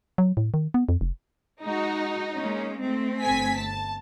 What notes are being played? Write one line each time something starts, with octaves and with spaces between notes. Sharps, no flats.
F#3
A2
D#3
B3
F2
F1
G#3 D#4 F#4
G#3 A#3 C#4
A3 C4
G1 G#5 B6
A5